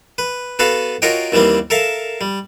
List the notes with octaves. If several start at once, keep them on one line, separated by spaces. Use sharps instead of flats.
B4
B3 F#4 A4 B4 F5
F4 F#4 A#4 C#5 D#5 G5
D#2 E3 G3 A#3 C4
A4 A#4 E5 F5
G3